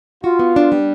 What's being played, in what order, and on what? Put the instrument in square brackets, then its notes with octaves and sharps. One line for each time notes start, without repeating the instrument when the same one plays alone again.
[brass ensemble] F4 [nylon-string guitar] F#4
[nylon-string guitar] B3
D4
G3